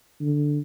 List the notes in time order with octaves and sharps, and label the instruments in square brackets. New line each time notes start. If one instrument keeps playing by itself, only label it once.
[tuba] D3